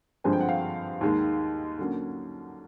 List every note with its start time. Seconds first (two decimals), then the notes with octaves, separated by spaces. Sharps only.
0.24 G2 D3 F3 G#3 C4 G#5
0.33 G5
0.41 F#5
0.49 F5 G5
1.01 D#2 D#3 G#3
1.79 D3 F#3 A#3 C#4